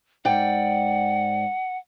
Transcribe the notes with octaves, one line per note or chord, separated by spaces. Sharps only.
G#2 D5 F#5 G5